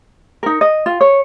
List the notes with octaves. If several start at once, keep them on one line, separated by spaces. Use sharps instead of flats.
D#4 A#4
D#5
F4
C#5